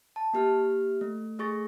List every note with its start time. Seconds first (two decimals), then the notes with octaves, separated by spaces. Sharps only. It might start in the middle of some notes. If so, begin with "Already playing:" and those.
0.16 A5
0.33 A#3 G4 F6
1.01 A3
1.39 A3 G#4 C#6 A6 A#6